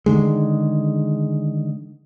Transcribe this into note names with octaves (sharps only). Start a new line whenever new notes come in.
D3 D#3 G#3